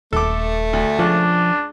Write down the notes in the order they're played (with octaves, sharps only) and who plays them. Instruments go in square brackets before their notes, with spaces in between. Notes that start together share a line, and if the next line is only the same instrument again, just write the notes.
[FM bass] D#1 [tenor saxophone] A3 [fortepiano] A4 D6
[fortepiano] D2
[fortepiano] C#2 [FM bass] F3 [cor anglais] D4